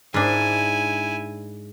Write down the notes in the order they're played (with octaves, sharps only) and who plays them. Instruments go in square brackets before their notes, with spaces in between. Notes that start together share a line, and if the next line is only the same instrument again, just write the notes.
[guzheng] G#2 D4 [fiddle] E4 G#5